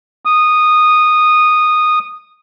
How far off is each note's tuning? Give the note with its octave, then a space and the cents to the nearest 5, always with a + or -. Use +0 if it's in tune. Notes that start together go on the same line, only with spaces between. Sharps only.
D#6 -10